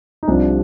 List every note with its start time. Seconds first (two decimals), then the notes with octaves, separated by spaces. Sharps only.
0.23 D#4
0.27 C2 C3 F3 D4